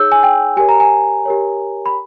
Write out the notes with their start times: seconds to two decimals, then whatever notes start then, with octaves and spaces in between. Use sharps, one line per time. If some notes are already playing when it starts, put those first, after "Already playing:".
Already playing: D#4 G#4 C#5 E6 G6
0.12 G#5
0.23 G5
0.57 G4 A#4 C#5 G#5
0.69 A#5
0.80 G#5
1.26 G4 A#4 C#5
1.86 B5